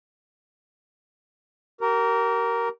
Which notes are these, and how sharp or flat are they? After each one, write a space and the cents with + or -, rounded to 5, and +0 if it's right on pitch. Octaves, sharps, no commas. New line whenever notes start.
G4 -40 A#4 +0